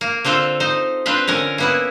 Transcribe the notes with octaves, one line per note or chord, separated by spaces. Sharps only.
A#3
D3 C4 F4 A4
D#4 C5
C4 D4 F4 B4
D3 C#4 A#4
A#3 B3 E4